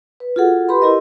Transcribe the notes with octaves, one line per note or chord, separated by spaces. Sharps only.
B4
F4 F#4 G#4 A4 F#5
G4 B4 B5 C6
E4 G4 A#4 D#5